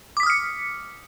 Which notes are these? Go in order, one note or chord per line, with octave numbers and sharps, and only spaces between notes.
D6 D#6 F6 B6 C#7